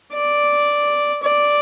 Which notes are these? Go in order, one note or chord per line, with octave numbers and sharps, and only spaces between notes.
D5
D5